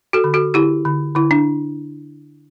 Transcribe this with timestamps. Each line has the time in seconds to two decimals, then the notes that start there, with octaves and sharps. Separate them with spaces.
0.13 F#4 A4
0.24 D3
0.34 F#4 A4
0.54 D3 E4 G4
0.85 D3
1.15 D3 E4
1.31 D4